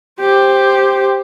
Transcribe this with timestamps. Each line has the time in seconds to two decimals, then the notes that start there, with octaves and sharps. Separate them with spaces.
0.20 G4 C5